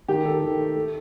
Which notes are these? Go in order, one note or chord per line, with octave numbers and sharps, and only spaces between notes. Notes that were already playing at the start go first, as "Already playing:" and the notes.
D#3 G4
D#3 A4
D#3
A3
A3